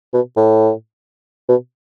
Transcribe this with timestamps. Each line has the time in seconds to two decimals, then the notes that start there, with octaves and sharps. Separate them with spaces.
0.14 B2
0.37 A2
1.49 B2